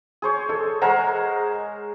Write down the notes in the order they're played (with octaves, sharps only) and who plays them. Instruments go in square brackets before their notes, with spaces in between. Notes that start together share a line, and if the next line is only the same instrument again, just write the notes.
[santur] G#4 C5 C#5
[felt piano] A4
[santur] G#3 A#4 G#5 [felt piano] C5 F#5 A#5